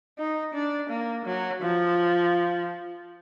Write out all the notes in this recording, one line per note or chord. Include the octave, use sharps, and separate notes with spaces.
D#4
D4
A#3
F#3
F3